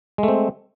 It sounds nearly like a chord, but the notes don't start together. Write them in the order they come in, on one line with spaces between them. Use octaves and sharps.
G#3 A3 C4